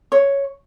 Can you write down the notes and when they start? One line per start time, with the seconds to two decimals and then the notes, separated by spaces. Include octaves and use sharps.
0.12 C#5